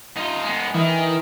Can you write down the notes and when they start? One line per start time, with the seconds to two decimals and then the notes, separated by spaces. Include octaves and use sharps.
0.17 D#4 F4
0.44 G#3 B3
0.75 D#3 E3